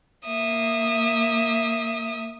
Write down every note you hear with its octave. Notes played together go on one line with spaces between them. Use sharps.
A#3 E5 D#6